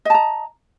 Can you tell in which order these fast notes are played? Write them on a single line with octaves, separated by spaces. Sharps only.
D#5 A5 A#5